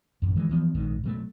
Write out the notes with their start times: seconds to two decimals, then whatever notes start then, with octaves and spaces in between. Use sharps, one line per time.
0.22 A1 F#2
0.36 D#3 E3 G#3
0.49 E3 F3 B3
0.75 A#1 G#2 D#3
1.04 B2 F#3 A3